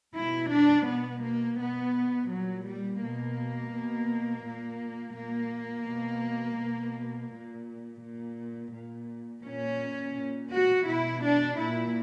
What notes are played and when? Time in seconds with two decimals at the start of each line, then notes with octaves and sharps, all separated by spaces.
0.15 B2 E4
0.50 D4
0.87 B2 B3
1.22 A#3
1.58 B2 B3
2.30 A#2 F#3
2.66 G3
3.01 B2 A#3
3.72 B2
4.45 A#2
5.15 A#2 A#3
5.87 B2
6.58 B2
7.31 A#2
8.02 A#2
8.74 A#2
9.44 A#2 C#4
10.16 A#2
10.52 F#4
10.87 B2 E4
11.23 D4
11.58 A#2 E4